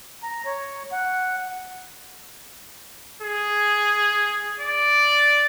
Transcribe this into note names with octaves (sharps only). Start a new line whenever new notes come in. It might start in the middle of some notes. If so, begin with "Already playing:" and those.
A#5
C#5
F#5
G#4
D5